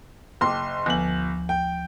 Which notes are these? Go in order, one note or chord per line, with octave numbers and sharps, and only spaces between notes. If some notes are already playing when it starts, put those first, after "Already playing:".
F#1 G5 A5 C6 D6
G1 D2 F3 G#5 F#7
G5